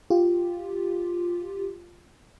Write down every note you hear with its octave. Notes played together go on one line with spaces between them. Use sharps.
F4 G4